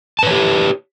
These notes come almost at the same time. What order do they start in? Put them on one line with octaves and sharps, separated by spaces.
A5 B4 C#5 G4